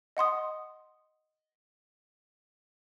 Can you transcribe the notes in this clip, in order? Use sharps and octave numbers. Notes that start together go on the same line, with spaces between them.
D#5 F#5 C6 D#6